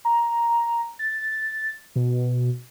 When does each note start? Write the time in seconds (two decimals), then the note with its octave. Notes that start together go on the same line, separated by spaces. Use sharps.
0.05 A#5
0.99 A6
1.96 B2